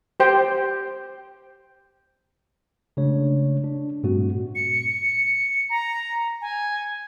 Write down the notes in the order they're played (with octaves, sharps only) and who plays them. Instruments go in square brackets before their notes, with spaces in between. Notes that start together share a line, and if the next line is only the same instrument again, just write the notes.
[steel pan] G4 C5 G5
[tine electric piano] C#3 G#3 A3 D4 C#5
D4
G2 A#2 G3 A3 C4 F#4
[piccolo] C#7
A#5
G#5